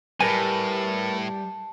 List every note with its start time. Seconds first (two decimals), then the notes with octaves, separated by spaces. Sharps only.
0.21 A2 G3 A#4 B4 G#5 A5 B5